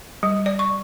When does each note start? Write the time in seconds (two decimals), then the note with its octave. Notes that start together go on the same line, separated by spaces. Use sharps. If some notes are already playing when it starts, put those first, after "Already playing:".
0.23 G3
0.46 D5
0.59 C#6